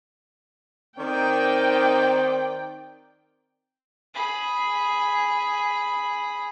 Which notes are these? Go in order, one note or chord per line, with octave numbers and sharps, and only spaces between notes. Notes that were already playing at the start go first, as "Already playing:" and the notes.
D#3 C4 D5 G5
G#4 B5